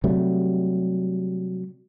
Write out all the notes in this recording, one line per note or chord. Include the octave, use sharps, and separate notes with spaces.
C3 F#3 G3 A3